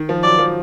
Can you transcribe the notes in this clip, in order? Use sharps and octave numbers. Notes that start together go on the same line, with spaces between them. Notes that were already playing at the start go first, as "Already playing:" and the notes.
Already playing: D#3
F3
F#3 D5
F3